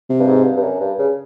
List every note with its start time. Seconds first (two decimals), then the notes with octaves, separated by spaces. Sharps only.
0.09 C3
0.19 G2
0.27 G#2
0.45 G2
0.57 G2
0.63 F#2
0.80 G2
0.99 C#3